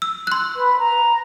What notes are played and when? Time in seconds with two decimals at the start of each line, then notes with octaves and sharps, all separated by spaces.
0.02 E6
0.27 C6 F#6
0.55 B4
0.79 A#5